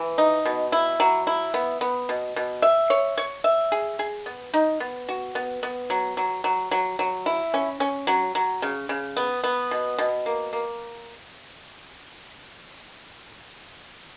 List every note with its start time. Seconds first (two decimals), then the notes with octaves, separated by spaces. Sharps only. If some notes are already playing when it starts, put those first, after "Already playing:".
Already playing: E3
0.18 D#4
0.45 B2
0.72 E4
1.00 F#3
1.27 E4
1.54 B3
1.81 B3
2.09 B2
2.36 B2
2.62 E5
2.90 C#5
3.17 C#5
3.44 E5
3.72 G#4
3.99 G#4
4.26 B3
4.54 D#4
4.80 B3
5.09 F#4
5.35 B3
5.63 B3
5.90 F#3
6.17 F#3
6.44 F#3
6.71 F#3
6.99 F#3
7.26 E4
7.54 C#4
7.80 C#4
8.07 F#3
8.35 F#3
8.62 C#3
8.89 C#3
9.17 B3
9.44 B3
9.71 B2
9.98 B2
10.26 A#3
10.53 A#3